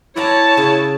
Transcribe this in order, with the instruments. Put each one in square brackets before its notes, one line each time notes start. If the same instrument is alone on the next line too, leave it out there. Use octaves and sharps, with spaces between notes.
[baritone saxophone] E4 [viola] C#5 A5 [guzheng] D5 F#5 A#5
[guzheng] C#3